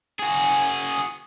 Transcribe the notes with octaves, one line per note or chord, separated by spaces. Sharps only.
F#4 G#4